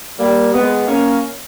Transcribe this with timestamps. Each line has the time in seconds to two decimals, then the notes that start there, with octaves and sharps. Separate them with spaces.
0.19 G3 A#3
0.54 G#3 B3
0.87 A#3 C#4